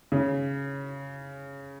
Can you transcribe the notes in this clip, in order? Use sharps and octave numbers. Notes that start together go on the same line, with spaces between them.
C#3